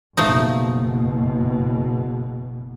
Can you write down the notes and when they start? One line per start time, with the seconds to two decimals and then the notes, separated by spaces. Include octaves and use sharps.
0.17 F#1 B2 F3 A3 D#4